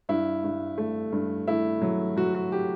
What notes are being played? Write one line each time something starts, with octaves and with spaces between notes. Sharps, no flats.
G2 E4
G2
A3
G2
A3 E4
F#3
F#3 F#4
F#4
G4